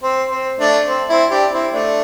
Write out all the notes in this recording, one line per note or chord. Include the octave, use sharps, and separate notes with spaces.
C4
C4
A3 D4
C4
C4 E4
D4 G4
C4 E4
A3 D4